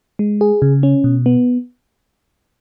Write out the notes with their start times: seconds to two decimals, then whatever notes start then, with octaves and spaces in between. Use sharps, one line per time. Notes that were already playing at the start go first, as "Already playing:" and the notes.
0.19 G#3
0.41 G#4
0.62 C#3
0.83 C#4
1.04 B2
1.26 B3